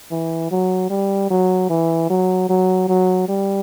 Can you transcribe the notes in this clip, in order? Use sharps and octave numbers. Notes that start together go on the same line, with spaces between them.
E3
F#3
G3
F#3
E3
F#3
F#3
F#3
G3